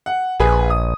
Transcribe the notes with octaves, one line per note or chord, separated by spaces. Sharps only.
F#5
A#1 G#4 B4 G#5
D#6